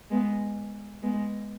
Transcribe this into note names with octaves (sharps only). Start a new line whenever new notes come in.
G#3 B3
G#3 B3